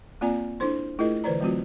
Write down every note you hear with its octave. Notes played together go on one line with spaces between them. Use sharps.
A#3 C4 F4 D5 G#5 A#5
D4 E4 A4 C5 C6
A3 E4 F4 G#4 A#4 D#5
D3 E3 B4 C5 D5 A#5
F#3 A3 C4 F4 F#4